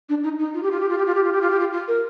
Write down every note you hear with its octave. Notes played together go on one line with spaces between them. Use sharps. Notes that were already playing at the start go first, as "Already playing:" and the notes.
D4
D#4
D#4
F4
G4
F4
G4
F4
G4
F4
G4
F4
G4
F4
G4
F4
F4
A#4